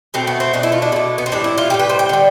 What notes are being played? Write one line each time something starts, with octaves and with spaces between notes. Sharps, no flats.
B2 A3 C4
B3
C4
B2 A3 D4
E4
F4
D4
B2 A3 E4
B3
C4
A2 E3 G3 D4
E4
F4
A2 E3 G3 G4
B4
C5
G5
D3 G3